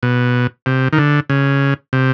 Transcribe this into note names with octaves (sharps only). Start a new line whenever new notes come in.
B2
C3
D#3
D3
C#3
C3